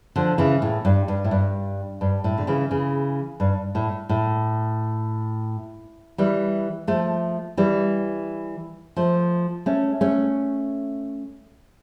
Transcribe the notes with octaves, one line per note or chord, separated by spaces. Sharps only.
D3 F3
C#3 E3
A2
G2
G2
A2
G2
G2
A2
D3
C#3 E3
C#3 E3
G2
A2
A2
E3 G3
F3 A3
E3 G3
F3 A3
A3 C#4
A3 C#4